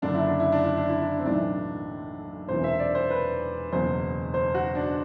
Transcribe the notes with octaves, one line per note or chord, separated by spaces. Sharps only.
F#1 F#2 D3 D4
E4
D4
E4
D4
E4
D4
E4
D4
C4
B1 A2 E3 D4
E1 E2 C3 E3 C5
E5
D5
C5
B4
F#1 E2 B2 C5
C5
F#4
D4